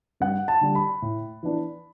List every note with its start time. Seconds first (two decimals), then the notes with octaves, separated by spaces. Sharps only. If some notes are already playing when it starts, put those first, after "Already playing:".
0.20 G2 F#5
0.48 A5
0.61 D3 G3
0.75 B5
1.02 A2
1.43 E3 B3 D4